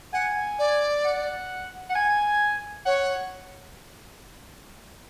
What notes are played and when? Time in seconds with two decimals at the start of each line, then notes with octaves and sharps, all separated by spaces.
0.13 F#5 G#5
0.59 D5
1.04 F#5
1.90 F#5
1.95 G#5
2.85 C#5 F#5